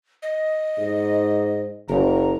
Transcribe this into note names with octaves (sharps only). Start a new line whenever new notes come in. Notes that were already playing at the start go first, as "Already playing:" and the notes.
D#5
G#2
F#1 A#5